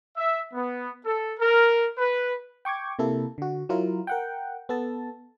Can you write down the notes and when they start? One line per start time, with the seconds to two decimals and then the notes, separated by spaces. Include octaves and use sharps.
0.17 E5
0.53 B3
1.05 A4
1.39 A#4
1.98 B4
2.65 G5 C#6 D6 G#6
2.99 C3 A#3 E4 A4
3.38 D3 F#4
3.69 F#3 E4 F4 A#4
4.07 A#4 F#5 G5
4.69 B3 A4 A5